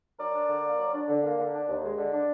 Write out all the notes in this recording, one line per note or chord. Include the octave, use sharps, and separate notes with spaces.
F#3 A#4 D5
D4
D3
A#3
F#3
D4
D3
A#3
D3
D4
D#2
G#3
D3
D4